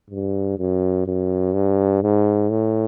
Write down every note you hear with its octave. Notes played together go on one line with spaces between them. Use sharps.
G2
F#2
F#2
G2
G#2
A2